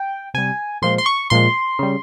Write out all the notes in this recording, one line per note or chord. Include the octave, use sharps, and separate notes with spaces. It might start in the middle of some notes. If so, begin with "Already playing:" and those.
Already playing: G5
C3 G3 G#5
A#2 F3 G#3 C6
C6
C#6
A#2 F3 G#3 C6
C#3 G3